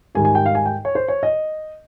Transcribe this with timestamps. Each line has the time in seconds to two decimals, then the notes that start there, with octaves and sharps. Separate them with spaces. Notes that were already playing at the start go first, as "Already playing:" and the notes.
0.15 G#2 D#3 G3 G#5
0.25 G#5
0.35 G5
0.46 F5
0.55 G#5
0.66 G5
0.85 C#5
0.95 C5
1.08 C#5
1.23 D#5